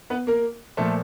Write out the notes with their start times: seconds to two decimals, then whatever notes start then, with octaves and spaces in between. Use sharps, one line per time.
0.10 B3 B4
0.27 A#3 A#4
0.77 A#2 F3 A3 A4